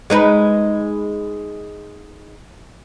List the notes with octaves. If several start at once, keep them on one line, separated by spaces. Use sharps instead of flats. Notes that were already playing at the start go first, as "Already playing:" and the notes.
G#3 D#4 B4